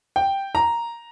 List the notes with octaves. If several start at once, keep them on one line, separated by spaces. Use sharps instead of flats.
G5
A#5